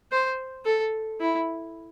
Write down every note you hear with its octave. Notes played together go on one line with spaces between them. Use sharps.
C5
A4
E4